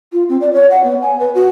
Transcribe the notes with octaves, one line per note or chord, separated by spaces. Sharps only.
F4
C4
D5
C#5
F#5
B3
G#5
B4
F#4